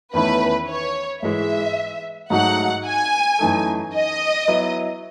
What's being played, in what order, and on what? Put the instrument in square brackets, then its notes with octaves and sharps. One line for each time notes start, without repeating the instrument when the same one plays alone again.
[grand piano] E2 D#3 A3 C#4 E4 [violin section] B4
[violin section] C#5
[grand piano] G#2 E3 G#3 [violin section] E5
[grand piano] G#2 F#3 A3 D#4 F#4 [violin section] F#5
[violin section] G#5
[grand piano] F#2 E3 A3 D#4 A4
[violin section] D#5
[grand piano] F#3 B3 E4